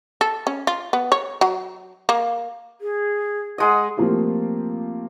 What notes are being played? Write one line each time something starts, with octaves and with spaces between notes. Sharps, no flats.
A4
C#4
F4
B3
C#5
F#3
A#3
G#4
G#3 D#5 F#5
F3 A3 A#3 C4 F4 G4